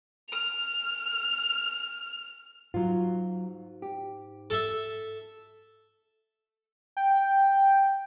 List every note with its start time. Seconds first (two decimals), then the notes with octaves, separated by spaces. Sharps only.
0.28 F6 F7
2.74 G#2 F#3 F4
3.82 G4
4.50 A4 E5
6.97 G5